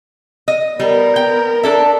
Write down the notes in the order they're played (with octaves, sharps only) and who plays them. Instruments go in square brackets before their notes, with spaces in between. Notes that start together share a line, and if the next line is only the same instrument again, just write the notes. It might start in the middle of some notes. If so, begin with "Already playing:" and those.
[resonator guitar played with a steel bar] D#5
[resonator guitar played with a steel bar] G3 [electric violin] B3 A#4
[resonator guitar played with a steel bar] G5
D4 A4 E5